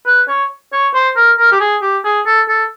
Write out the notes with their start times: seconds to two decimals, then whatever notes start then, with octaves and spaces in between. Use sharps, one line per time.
0.06 B4
0.28 C#5
0.73 C#5
0.94 C5
1.16 A#4
1.38 A#4
1.52 G4
1.61 G#4
1.82 G4
2.05 G#4
2.26 A4
2.48 A4